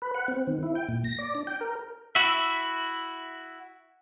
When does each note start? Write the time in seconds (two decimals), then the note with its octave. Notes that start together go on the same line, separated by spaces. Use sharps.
0.02 B4
0.14 F#5
0.28 C4
0.47 D#3
0.63 E4
0.75 G5
0.89 A#2
1.04 A#6
1.18 D5
1.35 D4
1.47 G5
1.61 A#4
2.15 E4 F#4 E5